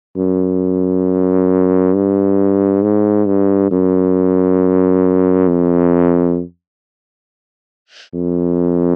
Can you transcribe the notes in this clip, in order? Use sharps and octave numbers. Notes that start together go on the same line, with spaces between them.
F#2
G2
G#2
G2
F#2
F2
F2